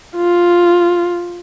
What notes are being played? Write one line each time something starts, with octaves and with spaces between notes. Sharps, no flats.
F4